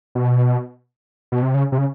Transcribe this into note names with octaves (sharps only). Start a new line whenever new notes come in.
B2
B2
C3
C#3
C3
C#3